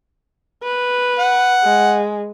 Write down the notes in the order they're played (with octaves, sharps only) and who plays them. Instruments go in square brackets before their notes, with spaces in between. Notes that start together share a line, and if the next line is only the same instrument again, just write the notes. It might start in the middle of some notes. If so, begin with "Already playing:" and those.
[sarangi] B4
[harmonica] F#5
[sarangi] G#3